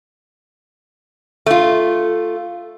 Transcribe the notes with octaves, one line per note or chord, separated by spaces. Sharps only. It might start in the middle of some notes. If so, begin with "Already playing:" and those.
A3 F4